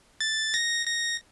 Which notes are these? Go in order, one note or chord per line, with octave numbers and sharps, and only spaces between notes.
A6
A#6
A#6